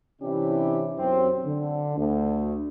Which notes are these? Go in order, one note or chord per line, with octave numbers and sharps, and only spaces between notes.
C3 E3 C#4 D4 E4 G4
B1 F#2 F#3 C4
D3
D2